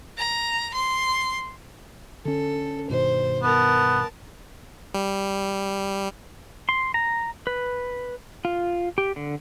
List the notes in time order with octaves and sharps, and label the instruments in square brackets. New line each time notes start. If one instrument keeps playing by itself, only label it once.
[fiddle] A#5
C6
[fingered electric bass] D3 C#4 [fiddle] A4
[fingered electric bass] G2 B2 D#3 [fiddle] C5
[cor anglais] B3 [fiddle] A#4 A5
[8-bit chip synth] G3
[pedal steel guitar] C6
A#5
B4
F4
G4
D3